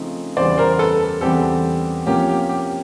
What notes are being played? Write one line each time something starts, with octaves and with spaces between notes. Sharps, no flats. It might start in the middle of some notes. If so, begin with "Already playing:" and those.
Already playing: C#3 F3 A3 C4 D#4
E2 C#3 E3 G3 C5 D5
A#4 C5
A4 B4
E2 C#3 E3 G3 C4 G4 A4
C3 F3 A#3 C#4 G4
G4
G4